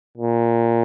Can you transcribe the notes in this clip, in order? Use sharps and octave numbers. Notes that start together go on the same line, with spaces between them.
A#2